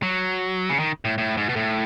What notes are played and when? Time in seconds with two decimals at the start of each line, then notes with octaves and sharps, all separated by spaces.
0.03 F#3
0.69 C#3
0.79 D#3
1.05 A2
1.18 A2
1.37 G#2
1.49 B2
1.56 A2